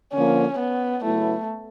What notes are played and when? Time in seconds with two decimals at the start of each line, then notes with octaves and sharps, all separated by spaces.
0.13 D3 F3 A#3 C#4
0.58 B3
1.03 C#3 F#3 A3 B3 E4